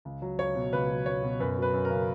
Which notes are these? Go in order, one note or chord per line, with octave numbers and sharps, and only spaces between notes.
C#2
F#3
C#2 C#5
B2
C#2 B4
F#3
C#2 C#5
B2
F#2 B4
F#3
B4
F#2
A#4
C#3